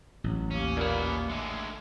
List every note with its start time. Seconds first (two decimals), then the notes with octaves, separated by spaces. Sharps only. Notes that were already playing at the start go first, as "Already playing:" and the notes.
0.24 A1 F#3
0.51 D#2 C#4
0.77 F#2 A#2 A#3 B3
1.29 D3 G#3 A3